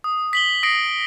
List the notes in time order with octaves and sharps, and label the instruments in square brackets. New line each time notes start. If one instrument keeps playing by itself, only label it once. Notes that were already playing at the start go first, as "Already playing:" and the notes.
[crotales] D#6
B6 F#7 G7
D#6 A#6 C7 D7